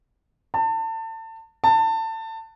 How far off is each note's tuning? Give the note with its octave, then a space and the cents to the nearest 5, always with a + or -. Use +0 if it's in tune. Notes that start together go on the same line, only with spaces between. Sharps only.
A5 +30
A5 +25